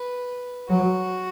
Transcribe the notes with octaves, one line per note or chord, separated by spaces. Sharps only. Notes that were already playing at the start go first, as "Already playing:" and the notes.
Already playing: B4
F#3 F#4